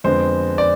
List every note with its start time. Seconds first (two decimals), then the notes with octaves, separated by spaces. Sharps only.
0.04 F2 D3 G#3 B3 C5
0.58 D5